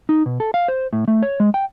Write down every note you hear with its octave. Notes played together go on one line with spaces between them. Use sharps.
D#4
B2
A4
F5
C5
A2
A3
C#5
G#3
G5